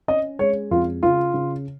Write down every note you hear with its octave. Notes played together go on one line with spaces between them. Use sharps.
C#4 D#5
G#3 C#5
F2 F4
C#3 F4
C#3